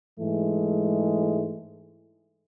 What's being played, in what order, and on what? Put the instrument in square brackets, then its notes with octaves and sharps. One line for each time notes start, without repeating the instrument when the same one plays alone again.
[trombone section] G#2 E3 G#3 A3